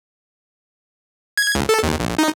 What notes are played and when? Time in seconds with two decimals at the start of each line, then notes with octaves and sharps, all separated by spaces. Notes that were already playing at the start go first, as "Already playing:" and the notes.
1.37 G#6
1.55 C#2
1.69 A4
1.83 D#2
2.00 A#1
2.18 D#4